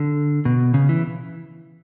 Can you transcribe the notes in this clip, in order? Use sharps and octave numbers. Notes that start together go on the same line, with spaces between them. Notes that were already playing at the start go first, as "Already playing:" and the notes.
Already playing: D3
B2
C#3
E3